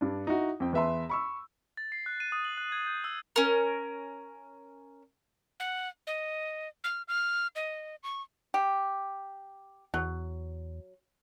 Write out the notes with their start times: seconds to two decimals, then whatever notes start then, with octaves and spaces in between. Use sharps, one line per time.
0.01 G2 D4
0.27 D#4 E4 F#4
0.60 F2 G5
0.73 E2 B4 E5 A5 C6
1.09 B5 C#6 E6
1.77 A6
1.92 C7
2.06 F#6
2.20 D#7
2.32 D#6
2.45 F#7
2.57 F#6
2.72 G#6
2.87 G6
3.04 E6
3.36 C#4 A#4
5.60 F#5
6.07 D#5
6.84 F6
7.08 F6
7.56 D#5
8.03 C#6
8.54 G4
9.94 E2 F#3